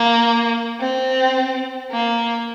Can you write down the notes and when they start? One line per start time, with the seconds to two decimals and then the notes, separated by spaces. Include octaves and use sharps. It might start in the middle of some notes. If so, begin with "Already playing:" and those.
Already playing: A#3
0.80 C4
1.92 A#3